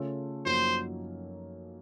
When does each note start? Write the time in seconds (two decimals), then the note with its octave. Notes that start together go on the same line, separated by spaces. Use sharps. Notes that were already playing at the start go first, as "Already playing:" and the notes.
Already playing: C#3 A3 C#4 F4 A4
0.45 F#2 F3 A#3 D#4 F#4 C5